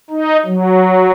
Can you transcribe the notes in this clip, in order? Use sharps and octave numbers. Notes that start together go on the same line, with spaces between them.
D#4
F#3